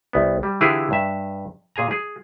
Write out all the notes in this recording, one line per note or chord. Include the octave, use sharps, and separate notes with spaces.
C2 B3
G3
D3 E3 E4 F4 G4 G#4
G2 E5
A#2 G#4 G#5 A#5
G#4